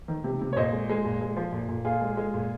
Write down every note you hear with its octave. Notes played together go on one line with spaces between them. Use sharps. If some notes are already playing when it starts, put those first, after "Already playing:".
D#3
C3
C3
C#5
A#2 C5 D#5
G#3
G#3
A#2
G#3
F3
A#2
A#2
A#2 F4 G#4
G#3
G#3
A#2